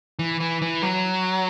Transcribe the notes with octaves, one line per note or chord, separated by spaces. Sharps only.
E3
E3
E3
F#3